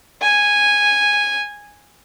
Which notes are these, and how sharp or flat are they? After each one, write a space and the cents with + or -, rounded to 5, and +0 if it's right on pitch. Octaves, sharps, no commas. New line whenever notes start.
G#5 -10